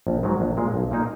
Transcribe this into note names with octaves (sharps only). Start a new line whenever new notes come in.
A#1
G#2 D#3 F#3
A#1
A#2 G#3
B1
A#2 A#3 D#4